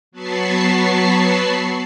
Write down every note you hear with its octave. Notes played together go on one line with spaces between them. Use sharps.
F#3 B3 A5 B5 C#6 C7